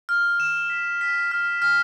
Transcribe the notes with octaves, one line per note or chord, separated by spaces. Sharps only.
F6
E7
B6
B6
F6
F6